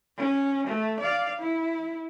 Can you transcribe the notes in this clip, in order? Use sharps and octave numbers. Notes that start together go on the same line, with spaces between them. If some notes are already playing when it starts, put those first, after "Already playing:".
C#4
A3
D5 F5
E4